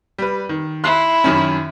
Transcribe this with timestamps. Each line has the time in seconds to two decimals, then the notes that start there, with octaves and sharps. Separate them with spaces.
0.18 G3 B4
0.49 D#3
0.84 E4 C6 F#6 C7
1.24 F#2 D#3 C#4